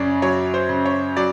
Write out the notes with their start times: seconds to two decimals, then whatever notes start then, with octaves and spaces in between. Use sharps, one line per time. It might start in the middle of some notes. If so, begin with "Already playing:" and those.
Already playing: F#2 C#3 C#5 D5
0.22 F#3 C#5
0.54 C5
0.69 C#3
0.86 C#5
1.17 F#3 D5